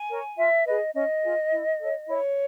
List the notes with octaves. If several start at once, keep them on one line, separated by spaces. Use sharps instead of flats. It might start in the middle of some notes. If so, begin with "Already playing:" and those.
Already playing: G#5
A#4 C#5
F4 E5
G#4 B4 D#5
C#4 D#5
F4 G#4
E4
A4 C#5
E4 C#5